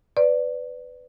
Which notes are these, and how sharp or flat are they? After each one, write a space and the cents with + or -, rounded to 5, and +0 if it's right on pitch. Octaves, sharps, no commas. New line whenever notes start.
B4 +20 D5 +0